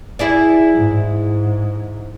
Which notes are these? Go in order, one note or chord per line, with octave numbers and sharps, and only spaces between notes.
E4 G#4 D5
G#2